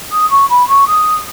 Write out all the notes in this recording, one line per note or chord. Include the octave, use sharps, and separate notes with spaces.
D#6
C#6
B5
C#6
D#6